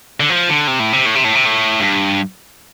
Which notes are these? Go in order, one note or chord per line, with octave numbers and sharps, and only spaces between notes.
D3
F3
D3
C3
A2
C3
A2
C3
A2
C3
A2
G2